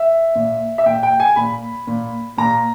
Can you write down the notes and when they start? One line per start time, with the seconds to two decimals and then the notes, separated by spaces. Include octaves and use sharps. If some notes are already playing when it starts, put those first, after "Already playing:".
Already playing: E5
0.35 A#2
0.78 E5
0.86 A#2 G5
1.03 G5
1.20 G#5
1.36 A#2 B5
1.87 A#2
2.38 A#2 A#5